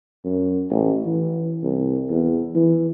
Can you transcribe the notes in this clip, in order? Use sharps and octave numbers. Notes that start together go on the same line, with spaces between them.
F#2
A1
E3
C2
E2
E3